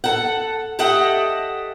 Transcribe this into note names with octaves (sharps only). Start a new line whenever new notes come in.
A4 F#5
G4 A4 D#5 E5 F#5